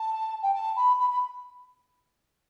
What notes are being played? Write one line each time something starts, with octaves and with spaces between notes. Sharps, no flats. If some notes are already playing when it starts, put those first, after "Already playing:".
Already playing: A5
G5
A5
B5
B5
B5